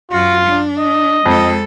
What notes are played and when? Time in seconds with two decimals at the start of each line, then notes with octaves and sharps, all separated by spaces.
0.11 F#2 F4 F#4
0.46 D4
0.79 D#5
1.26 F2 G#3 A4